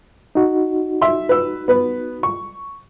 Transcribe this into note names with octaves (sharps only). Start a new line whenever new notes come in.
D#4 F#4
E5 C6
B4 E6
B3 B4
C#6